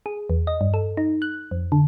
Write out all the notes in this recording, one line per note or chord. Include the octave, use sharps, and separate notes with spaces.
G#4
E2
D#5
G2
A4
D#4
F#6
F2
D3